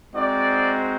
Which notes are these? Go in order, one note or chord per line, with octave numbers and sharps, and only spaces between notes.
G#3 C4 D#4 F#4 D5